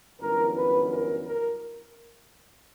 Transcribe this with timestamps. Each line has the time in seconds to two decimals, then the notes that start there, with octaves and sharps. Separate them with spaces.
0.21 G1 F#2 E3 A#4
0.57 B4
0.91 A#4
1.26 A#4